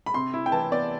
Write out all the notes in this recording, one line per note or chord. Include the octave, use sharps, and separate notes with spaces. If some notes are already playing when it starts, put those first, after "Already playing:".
B5
C3 C6
E4
G5
E3 A5
B3 D5